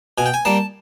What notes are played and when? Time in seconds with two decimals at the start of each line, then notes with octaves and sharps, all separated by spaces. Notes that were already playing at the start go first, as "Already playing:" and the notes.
0.18 B2 G#5
0.26 G5
0.34 G#5
0.45 G3 A#3 A5